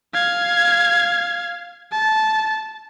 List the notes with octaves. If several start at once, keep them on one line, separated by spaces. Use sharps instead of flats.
F5 G#6
A5